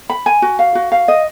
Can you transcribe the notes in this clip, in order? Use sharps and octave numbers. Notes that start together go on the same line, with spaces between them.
B5
G#5
F#4
F5
F#4
F5
D#5